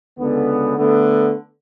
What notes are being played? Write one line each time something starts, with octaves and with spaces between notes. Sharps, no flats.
C#2 D3 B3
D3 A3 B3